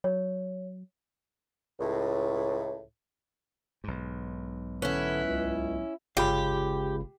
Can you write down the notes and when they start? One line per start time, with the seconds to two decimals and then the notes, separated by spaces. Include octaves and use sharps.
0.04 F#3 C#5
1.79 C#2 A2
3.84 B1 G#2
4.82 D3 C#4 E4 B4
5.25 C#2
6.17 G1 C#2 F4 G4 G#4 F5 B5